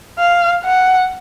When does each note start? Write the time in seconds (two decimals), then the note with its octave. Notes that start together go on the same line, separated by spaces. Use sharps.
0.18 F5
0.65 F#5